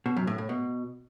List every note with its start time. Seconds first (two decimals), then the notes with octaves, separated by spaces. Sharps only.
0.06 B2
0.17 F#2
0.27 A2
0.38 A2
0.49 B2